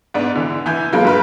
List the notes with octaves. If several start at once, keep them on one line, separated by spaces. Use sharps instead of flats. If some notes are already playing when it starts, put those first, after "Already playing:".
G#2 B3 D4
D3 E3
E3 G#5 G6 G#6
F#3 G#3 A#3 F4 A4 B4
G2 B4 F6